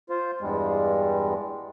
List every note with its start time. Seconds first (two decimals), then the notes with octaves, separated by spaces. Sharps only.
0.10 F4 C5
0.41 E2 G2 G3 G#3